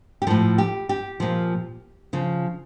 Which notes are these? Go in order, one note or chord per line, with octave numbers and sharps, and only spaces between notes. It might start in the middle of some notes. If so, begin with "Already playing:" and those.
G4
A2 F3 A4
G4
G4
A#2 F3
C#3 F3